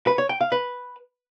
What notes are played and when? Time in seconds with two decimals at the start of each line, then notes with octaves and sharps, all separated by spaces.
0.07 B4
0.18 C#5
0.29 G5
0.41 F5
0.52 B4